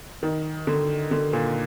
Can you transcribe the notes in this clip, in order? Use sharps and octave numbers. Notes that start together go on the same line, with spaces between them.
D#3
D3
D3
A#2